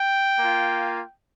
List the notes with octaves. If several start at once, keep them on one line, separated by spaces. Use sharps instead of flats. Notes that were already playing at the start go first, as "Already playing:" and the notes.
Already playing: G5
A#3 F4